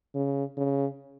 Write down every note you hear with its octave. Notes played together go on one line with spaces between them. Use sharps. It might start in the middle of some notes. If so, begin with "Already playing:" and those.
C#3
C#3